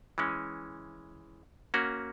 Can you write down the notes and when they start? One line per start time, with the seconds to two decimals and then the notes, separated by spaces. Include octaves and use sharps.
0.18 E3 G#3 C#4
1.74 A#3 C#4 F#4